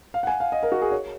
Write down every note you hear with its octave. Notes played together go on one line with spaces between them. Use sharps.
F5
F#5
G#5
F5
D#5
A#4
F#4
G#4
C#5